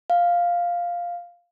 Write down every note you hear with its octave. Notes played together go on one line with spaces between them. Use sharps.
F5